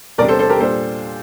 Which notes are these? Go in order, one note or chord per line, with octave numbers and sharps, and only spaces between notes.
E2 C3 G3 D4 A#4 D5
A4 C5
A4 C5
G4 A#4
A#2 G3 D4 A4 C5